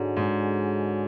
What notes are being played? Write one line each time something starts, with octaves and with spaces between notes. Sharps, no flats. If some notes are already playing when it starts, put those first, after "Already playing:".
Already playing: G#2 D3 G#3 D4 F#4 C#5
G#2